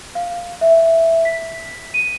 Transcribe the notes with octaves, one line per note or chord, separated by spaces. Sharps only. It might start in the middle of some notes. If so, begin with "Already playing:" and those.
F5
E5
B6
D#7